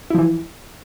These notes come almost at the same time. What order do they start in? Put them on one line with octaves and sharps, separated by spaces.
E4 F3 E3